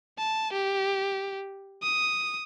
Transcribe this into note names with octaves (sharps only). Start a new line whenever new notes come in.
A5
G4
D#6